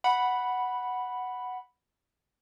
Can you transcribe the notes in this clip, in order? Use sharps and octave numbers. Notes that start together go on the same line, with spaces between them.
F#5 B5